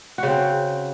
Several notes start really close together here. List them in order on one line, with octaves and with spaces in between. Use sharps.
F#4 C#3 C4